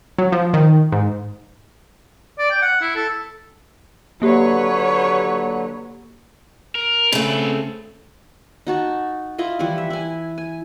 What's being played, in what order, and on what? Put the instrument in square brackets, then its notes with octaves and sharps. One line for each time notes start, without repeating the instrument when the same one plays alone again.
[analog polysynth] F#3
F3
D#3
G#2
[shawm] D5
G5
F#5
E4
A4
[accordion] D3 F#3 [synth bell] A#3 G4 [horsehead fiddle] B4 C#5
[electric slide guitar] A#4
[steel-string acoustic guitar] C#3 A3 [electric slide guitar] C4 B4
[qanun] D#4 F#4 A5
E4 F4 D#5
E3 F3 G3 E4
E5
E4 G#5
G#5